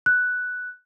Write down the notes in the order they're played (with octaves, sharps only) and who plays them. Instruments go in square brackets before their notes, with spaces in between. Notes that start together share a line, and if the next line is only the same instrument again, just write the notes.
[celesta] F#6